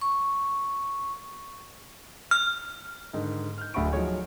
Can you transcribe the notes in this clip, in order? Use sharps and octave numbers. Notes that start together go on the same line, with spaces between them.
C#6
F6
G#2 D3 D#3
F6 G6
D1 D2 F#5 B5 C#6 D7
F3 F#3 D#4 G#4 C#5